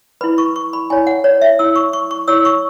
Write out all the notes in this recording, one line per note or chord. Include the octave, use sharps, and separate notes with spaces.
E4 B4 B5
C#6
C#6
B5
E4 C#5 G#5
F#5
C#5
E5
E4 C#5 E6
C#6
C#6
C#6
E4 C#5 E6
C#6